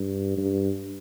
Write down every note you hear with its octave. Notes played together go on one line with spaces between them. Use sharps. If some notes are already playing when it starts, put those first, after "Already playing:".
Already playing: G2
G2